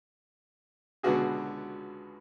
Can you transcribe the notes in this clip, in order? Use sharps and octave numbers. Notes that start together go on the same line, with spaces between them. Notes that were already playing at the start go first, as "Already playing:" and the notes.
C#2 B2 D3 B3 F#4 G#4